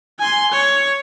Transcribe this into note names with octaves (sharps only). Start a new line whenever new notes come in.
G#5 C6
C#5